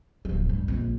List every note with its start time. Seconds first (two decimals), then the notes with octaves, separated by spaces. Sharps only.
0.25 D1 F3
0.49 G2
0.68 A#1 F2